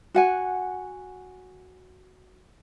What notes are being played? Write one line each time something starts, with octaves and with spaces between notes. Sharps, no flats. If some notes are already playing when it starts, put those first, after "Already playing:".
F#4 F#5 G#5